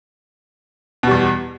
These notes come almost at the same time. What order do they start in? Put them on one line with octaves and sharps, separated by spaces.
B2 G3 E2